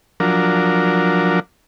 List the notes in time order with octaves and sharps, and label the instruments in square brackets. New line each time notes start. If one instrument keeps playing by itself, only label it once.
[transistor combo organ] F3 F#3 D4 A#4